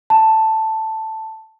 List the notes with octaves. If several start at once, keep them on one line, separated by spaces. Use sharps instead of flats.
A5